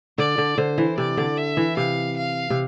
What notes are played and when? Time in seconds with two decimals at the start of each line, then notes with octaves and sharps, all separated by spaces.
0.18 D3 D5
0.38 D3
0.58 D3 C5
0.78 E3
0.98 C3 D5
1.17 D3
1.37 E5
1.57 E3
1.77 C3 F5
2.17 F5
2.50 C3